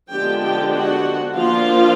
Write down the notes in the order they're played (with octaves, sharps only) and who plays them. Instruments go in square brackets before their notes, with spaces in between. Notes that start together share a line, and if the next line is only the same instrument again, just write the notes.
[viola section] D3 F3 G#3 B3 D4 G4 G5
G4 G5
F#4 F#5
F3 A#3 D4 F4 F5